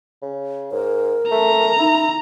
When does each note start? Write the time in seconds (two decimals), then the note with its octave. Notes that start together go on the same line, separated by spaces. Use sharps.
0.22 C#3
0.72 G#2 A#4
1.31 A3 A#5
1.79 D#4 E4